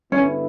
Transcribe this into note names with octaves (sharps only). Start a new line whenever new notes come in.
G2 D3 G3 B3 C#4 E4